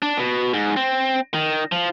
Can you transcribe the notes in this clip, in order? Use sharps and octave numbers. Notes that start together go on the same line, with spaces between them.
D4
B2
G#2
C4
D#3
F3